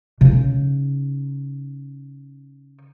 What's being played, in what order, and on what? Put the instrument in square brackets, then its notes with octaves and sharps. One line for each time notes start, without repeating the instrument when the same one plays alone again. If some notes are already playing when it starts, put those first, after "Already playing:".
[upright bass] C#3 D#4